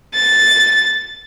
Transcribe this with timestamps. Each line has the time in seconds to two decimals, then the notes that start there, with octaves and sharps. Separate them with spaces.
0.15 A6